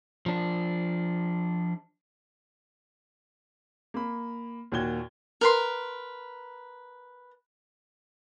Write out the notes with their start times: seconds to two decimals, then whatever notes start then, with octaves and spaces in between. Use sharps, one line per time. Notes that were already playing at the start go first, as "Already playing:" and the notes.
0.26 F3 D4
3.94 A#3 B5
4.72 D#2 A#2 F#4 G#6 G7
5.41 A#4 B4 C6